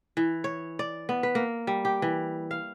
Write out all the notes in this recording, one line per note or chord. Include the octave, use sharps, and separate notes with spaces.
E3
C#5
D5
B3
B4
A#3
G3
G4
E3
F5